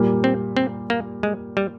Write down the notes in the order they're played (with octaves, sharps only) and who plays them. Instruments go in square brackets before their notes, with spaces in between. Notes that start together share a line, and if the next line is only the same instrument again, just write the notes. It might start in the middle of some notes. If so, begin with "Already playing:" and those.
Already playing: [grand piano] A#2 G3 A#3
[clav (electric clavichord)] C4
C4
A#3
G#3
G3